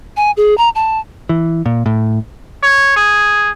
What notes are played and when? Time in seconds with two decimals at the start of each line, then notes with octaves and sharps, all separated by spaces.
0.17 G#5
0.37 G#4
0.58 A#5
0.75 A5
1.29 E3
1.66 A#2
1.86 A2
2.63 C#5
2.96 G#4